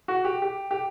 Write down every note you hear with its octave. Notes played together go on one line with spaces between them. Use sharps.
F#4
G4
G4
G4